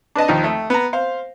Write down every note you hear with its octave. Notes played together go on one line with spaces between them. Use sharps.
D4 B4 D#5 A5
D#2 F3 D#4
A3
B3 A#5
C5 F5